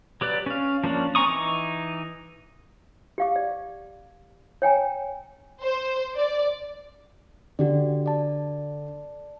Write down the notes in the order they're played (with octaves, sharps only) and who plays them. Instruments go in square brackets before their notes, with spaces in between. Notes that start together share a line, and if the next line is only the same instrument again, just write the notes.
[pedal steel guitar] F#3 G4 B4 D5 F#6
C#4 F5
F3 A#3 C#4 D4
C4 G#5 A#5 C#6 D#6
E3 D#4 C#6 D6
[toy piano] G4 F5 D6
D5
C#5 G5 G#5 A#5
[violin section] C5
D5
[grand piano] D3 [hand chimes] F#4 G4 D5
[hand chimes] D5 A5